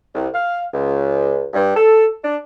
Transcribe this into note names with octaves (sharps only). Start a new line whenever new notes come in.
C2
F5
C#2
G2
A4
D4